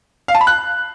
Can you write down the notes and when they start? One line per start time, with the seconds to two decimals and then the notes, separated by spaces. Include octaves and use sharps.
0.28 F5
0.35 A5
0.41 B5
0.47 F#6